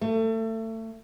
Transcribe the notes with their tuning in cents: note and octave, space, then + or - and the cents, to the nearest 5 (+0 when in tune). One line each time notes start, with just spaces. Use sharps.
A3 +25